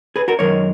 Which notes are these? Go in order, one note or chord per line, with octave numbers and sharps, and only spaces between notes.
G#4 B4
F#4 A#4
F#2 D#3 G#3 A#4 C#5